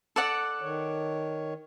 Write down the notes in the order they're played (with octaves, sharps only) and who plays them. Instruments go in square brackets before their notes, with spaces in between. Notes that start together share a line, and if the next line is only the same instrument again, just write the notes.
[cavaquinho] A4 D5 F#5
[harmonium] D#3 C#5